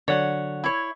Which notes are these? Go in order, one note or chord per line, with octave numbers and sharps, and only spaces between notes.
D3 F#3 C#5 D5 F#5
E4 C#5